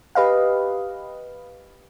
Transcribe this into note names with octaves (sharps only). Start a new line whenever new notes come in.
G4 B4 D#5 F5